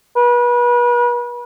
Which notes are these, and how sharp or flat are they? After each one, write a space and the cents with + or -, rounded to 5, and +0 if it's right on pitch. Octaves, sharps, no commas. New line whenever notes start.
B4 -35